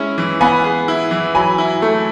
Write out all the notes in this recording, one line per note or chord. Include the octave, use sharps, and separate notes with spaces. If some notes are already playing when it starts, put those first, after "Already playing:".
Already playing: G#3 C#4 E4
E3
B3 G#5 B5
G#4
E4
E3
F#3 G#5 B5
E4
A3